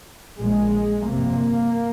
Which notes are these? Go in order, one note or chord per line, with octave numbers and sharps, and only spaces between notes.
A#1 A#2 G#3
G1 F2 C3 A#3